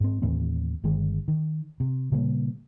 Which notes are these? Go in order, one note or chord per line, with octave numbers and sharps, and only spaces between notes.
G#2 C4
D#2 A2 E3 C4
G1 D#3 G#3
D#3
C3
A#2 C#3 G3 A#3